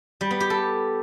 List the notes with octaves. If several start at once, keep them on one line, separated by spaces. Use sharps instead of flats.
G3
B3
G4
A4